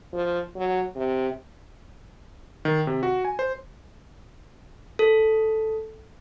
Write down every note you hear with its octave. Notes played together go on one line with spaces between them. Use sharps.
F3
F#3
C3
D#3
C3
F#4
G#5
C5
A4